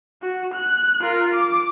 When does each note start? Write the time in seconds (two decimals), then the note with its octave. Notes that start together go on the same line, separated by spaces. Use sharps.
0.22 F#4
0.54 F#6
1.01 F4 A#4
1.35 D6